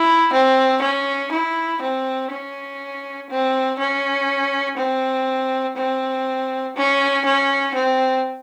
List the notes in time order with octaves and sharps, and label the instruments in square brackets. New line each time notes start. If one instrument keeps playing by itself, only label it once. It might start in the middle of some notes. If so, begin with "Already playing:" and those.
Already playing: [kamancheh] E4
C4
C#4
E4
C4
C#4
C4
C#4
C4
C4
C#4
C#4
C4